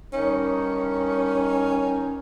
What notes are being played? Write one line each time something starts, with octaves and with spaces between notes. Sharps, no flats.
G2 D#3 C#4 D#4